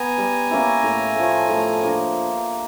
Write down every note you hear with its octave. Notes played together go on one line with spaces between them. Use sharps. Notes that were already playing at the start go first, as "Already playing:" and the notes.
Already playing: B3 G#5 A#5
G3
A#3 C#4 E4
A2
F3 A3
A2
F3 A#3 D4